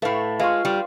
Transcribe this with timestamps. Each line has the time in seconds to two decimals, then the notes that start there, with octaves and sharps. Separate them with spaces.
0.02 A2 A3 B4 F5
0.39 G#3 F4 B4 F5 C6 C#6
0.65 G3